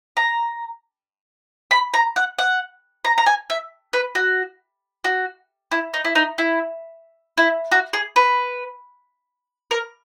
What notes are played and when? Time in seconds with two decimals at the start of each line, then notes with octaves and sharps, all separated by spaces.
0.17 A#5
1.71 B5
1.94 A#5
2.16 F#5
2.38 F#5
3.05 A#5
3.18 A#5
3.26 G#5
3.50 E5
3.93 B4
4.15 F#4
5.04 F#4
5.71 E4
5.94 D#4
6.05 E4
6.15 D#4
6.38 E4
7.38 E4
7.71 F#4
7.93 G#4
8.16 B4
9.71 A#4